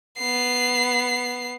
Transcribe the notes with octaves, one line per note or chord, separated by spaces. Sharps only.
B3 C7